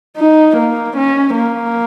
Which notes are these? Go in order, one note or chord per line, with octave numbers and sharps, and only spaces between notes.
D#4
A#3
C#4
A#3